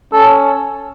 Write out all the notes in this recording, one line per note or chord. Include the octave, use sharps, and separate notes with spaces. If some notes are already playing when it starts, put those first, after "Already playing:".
C#4 A4